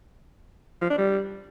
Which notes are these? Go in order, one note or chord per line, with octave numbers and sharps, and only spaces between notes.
F3
D4
G3